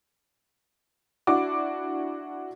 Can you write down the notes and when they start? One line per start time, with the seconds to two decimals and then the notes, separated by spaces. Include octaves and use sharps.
1.27 D4 E4 F#4 D6